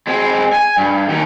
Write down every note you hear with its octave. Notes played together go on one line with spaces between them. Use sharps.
G#3 C4
G#5
G2
D#2 D#3